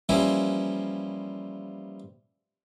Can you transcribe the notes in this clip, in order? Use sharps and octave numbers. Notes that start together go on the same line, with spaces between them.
E3 F3 G3 A#3 C#4 E4